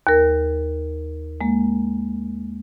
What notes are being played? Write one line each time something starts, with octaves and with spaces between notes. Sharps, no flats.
D#2 A#4
G#3 A#3